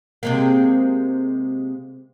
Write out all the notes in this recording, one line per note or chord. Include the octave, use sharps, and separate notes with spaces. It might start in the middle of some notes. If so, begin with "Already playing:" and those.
C3 G#3 A#3